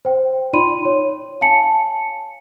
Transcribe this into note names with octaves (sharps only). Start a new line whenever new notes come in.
C5 G5
D#4 F4 D5 B5 C6 D#7
C#5
F5 G#5 A5 C#7